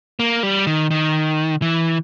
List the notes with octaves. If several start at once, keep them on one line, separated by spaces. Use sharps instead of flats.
A#3
G3
D#3
D#3
E3